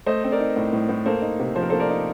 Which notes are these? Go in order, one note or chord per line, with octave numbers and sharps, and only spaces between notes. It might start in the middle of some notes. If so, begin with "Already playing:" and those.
A3 C5 D#5
C4
A#4 D5
D#4
A2
A2
A2
A#3 A4 C5
D#4
C3
F3 C5
A#4
A#3 A4 C5
A#4 D5
D#4